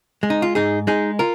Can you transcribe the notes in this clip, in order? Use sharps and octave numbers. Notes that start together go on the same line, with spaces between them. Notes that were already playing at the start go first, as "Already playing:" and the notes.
G#3
D#4
F4
G#2 D#4 G#4
G#3 D#4 G#4
F4 A#4